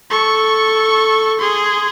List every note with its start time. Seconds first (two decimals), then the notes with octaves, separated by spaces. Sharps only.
0.10 A4 C#6
1.39 G#4 C6